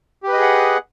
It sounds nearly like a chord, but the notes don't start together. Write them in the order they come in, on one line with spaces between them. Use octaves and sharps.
G4 B4 D#5 G#4 F#5